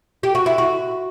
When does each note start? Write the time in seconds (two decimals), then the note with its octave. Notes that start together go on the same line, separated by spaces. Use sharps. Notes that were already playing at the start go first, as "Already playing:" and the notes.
0.23 G4
0.35 F#4
0.46 E4
0.58 F#4